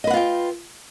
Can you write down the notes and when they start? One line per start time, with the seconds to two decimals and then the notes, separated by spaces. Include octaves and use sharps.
0.04 D#5
0.07 B4
0.10 F#5
0.13 F4
0.17 G5